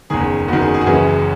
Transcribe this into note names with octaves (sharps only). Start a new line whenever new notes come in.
F#1 E2 D#3 G#4
F#1 E2 D#3 F#4
G#4
G#4
F#4
F#1 F#2 C#3 E3 G#4